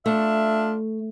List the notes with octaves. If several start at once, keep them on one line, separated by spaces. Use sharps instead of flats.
A3 D4 F4 E5